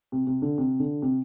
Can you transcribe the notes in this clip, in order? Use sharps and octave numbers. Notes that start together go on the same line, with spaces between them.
C3
C3
D3
C3
D3
C3